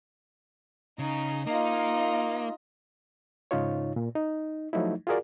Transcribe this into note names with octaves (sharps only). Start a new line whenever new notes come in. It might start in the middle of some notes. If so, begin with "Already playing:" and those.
C#3 D#4
A#3 D#4 F4 D#5
G#2 C#3 D#4 F4 C#5
A#2
D#4
F3 F#3 A3 D#4 E4
F4 F#4 G#4 A#4 D5